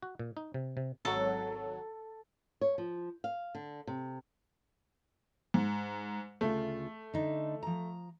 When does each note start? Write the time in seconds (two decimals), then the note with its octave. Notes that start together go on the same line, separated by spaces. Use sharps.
0.03 F#4
0.19 A#2
0.37 D#4
0.54 C3
0.77 C3
1.05 G#1 F#3 A4
2.61 C#5
2.78 F3
3.24 F5
3.55 D3
3.87 C3
5.54 G#2
6.41 D2 C#3 A3 F4
7.14 D3 D#4
7.63 F3 A#5